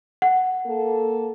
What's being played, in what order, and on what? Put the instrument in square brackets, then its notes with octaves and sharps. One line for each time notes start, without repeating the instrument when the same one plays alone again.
[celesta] F#5
[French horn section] A#3 A4